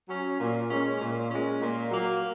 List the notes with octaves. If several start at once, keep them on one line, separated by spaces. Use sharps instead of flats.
F#3 C#4
A#2
G#3 C#4
A#2
G#3 C#4
A#2
F#3 A#3